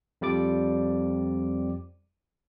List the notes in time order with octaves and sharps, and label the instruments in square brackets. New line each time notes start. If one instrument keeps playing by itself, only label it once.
[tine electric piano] F2 G3 D5 D6